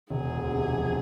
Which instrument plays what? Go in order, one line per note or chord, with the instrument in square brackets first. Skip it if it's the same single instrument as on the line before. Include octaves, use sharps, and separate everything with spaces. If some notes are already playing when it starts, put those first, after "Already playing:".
[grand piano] E1 [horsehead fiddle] G#4
[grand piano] D2
C3
F3